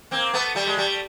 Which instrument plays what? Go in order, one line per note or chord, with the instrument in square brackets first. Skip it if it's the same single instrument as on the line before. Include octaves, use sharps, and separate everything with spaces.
[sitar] A#3 C4
A3 B3
G3 A3
G#3
G3 A3